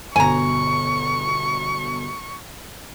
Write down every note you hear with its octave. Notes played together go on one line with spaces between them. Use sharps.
G1 B2 G#5 A#5 C#6